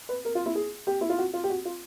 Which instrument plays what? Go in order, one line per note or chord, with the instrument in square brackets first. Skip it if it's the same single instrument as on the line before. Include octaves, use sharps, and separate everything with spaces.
[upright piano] B4
A#4
F4
E4
G#4
G4
E4
F4
F#4
F4
G4
F#4
F4